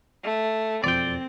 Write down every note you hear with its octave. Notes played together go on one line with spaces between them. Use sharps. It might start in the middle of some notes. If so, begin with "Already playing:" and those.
A3
E1 F2 F3 C4 D5 G5